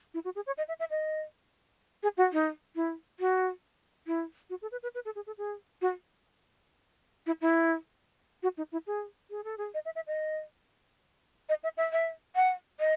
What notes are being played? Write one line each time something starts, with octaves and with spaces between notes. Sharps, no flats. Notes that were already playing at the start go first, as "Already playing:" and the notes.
E4
F#4
G#4
C#5
D#5
E5
E5
D#5
G#4
F#4
D#4
E4
F#4
E4
F#4
A4
B4
B4
B4
A4
G#4
A4
G#4
F#4
E4
E4
F#4
D#4
E4
G#4
G#4
A4
G#4
D#5
E5
E5
D#5
D#5
E5
E5
E5
F#5
D#5